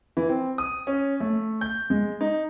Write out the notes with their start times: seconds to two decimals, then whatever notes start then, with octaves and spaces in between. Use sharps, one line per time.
0.17 E3
0.29 C4
0.58 D#6
0.87 C#4
1.20 A3
1.61 G6
1.90 G#3
2.21 D#4